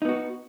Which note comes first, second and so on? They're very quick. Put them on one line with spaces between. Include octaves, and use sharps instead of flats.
D#4 B3 F#4